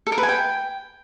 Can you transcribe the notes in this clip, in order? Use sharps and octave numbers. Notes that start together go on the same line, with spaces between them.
A4
A#4
B4
G#5
G5